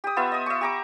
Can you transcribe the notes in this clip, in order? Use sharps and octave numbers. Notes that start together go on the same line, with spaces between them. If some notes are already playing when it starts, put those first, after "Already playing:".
G4 D#6
B3 F4 E5
D#5 D#6
E5 C#6
G4 A#5 D6